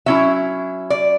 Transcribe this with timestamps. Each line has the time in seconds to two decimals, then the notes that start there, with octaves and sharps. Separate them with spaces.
0.06 F#3 C#4 E4 E5
0.90 D5